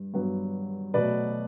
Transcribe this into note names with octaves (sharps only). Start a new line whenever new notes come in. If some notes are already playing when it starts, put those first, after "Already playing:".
Already playing: G2
G2 F#3 B3
B2 F#3 A3 B4 D5